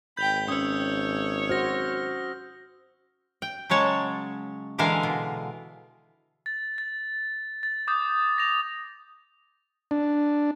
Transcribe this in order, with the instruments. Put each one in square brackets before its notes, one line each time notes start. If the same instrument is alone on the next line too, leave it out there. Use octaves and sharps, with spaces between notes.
[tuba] G#1 [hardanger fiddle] G5 B5 [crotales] G6 F7 G7
[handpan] C#4 [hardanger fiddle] C#5 [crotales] D#6 E6
[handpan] F#4 C5 [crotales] F6 A#6
[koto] G5
C#3 F#3 G#3 C#5 A5
A#2 D3 E3 G#3 A#4 F5
B2
[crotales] A6
A6
A6
D6 D#6 G6 A6
A#6 F7
[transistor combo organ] D4